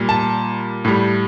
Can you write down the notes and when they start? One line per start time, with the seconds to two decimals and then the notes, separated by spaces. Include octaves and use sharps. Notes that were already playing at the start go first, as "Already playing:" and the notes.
Already playing: A#2 G3
0.09 A5
0.85 A2 G3